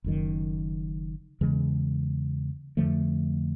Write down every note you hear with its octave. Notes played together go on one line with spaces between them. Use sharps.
F#1 F#2 D#3
E2 C#3 E3 G#3
F2 D3 F3 A3